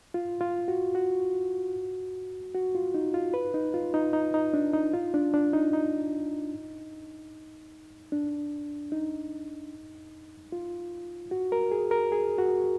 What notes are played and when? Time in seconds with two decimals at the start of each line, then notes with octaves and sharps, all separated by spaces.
0.14 F4
0.41 F4
0.68 F#4
0.95 F#4
2.55 F#4
2.75 F4
2.94 D#4
3.14 F4
3.34 B4
3.54 D#4
3.74 F4
3.94 D#4
4.13 D#4
4.34 D#4
4.54 D4
4.74 D#4
4.93 F4
5.14 D4
5.34 D4
5.53 D#4
5.73 D#4
8.12 D4
8.92 D#4
10.52 F4
11.31 F#4
11.52 A#4
11.72 G#4
11.91 A#4
12.12 G#4
12.38 F#4